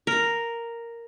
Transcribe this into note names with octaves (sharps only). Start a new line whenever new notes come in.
A#4